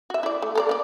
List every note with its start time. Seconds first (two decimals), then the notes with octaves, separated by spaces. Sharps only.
0.10 F#4 E5
0.23 E4 D5
0.42 A3
0.55 A4 A#4 D5
0.69 A#3 D5